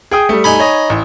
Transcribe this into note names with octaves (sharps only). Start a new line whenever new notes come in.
G#4 G5 D#6
G3 A3
D#4 G#5 B5
C#5 D#5
A1